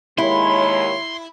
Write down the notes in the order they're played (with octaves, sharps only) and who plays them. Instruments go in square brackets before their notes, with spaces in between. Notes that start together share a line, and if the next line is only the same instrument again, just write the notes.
[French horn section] D#2 G#3 C#5 [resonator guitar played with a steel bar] E4 [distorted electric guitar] C6